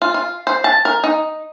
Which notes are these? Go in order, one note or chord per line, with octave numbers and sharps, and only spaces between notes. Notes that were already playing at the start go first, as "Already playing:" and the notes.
F4
F4
C5
A5
A#4
D#4